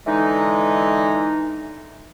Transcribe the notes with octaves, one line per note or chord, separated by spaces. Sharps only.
D3 E3 G#3 D#4